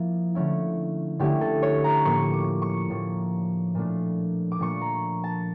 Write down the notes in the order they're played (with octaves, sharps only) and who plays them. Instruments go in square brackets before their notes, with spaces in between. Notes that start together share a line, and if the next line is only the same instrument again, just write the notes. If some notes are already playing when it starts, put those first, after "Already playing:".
Already playing: [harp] F3 A#3 E4
D3 A3 C#4 E4
D3 A3 C#4 E4 G4
A4
C#5
A#5
A2 F3 A#3 C#6
D6
C#6
A2 F3 A#3
A#2 F3 A3 D4
D6
A#2 F3 A3 D4 C#6
A#5
A5